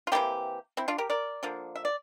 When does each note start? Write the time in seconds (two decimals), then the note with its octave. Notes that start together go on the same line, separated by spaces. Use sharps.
0.07 F4
0.12 C3 E3 G3 A#3 E4 G4
0.77 C4 E4
0.88 D4 F4
0.98 G4 A#4
1.10 A#4 D5
1.43 D3 F3 A#3
1.76 E5
1.85 D5